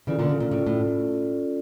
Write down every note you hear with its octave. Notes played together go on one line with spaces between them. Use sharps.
C#3 E3 C#4 F4 A4 D5
A#2 D3
C#3
A#2
A2 C#4 F4 A4 D5
A2